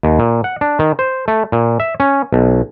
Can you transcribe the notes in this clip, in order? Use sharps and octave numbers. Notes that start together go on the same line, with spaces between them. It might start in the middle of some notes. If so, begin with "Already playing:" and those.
D#2
A#2
F#5
D4
D#3
C5
A3
A#2
E5
C#4
B1